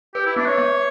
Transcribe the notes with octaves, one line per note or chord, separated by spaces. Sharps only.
G4 B4
E4
B3 D4
C#5
B3